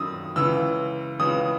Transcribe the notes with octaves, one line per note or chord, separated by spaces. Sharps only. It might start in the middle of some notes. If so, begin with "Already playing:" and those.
Already playing: F#2 D#3 D#6 E6
C#2 C#3 E3 E6
C#2 C#3 E3 D#6